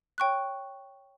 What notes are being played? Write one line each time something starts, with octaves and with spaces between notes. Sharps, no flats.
C#5 G5 C#6 F#6